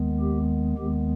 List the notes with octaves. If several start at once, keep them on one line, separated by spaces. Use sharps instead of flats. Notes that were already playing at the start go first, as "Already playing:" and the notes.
Already playing: D#2 D#3 G#3 B3
G4
D#2 D#3 G#3 B3 G4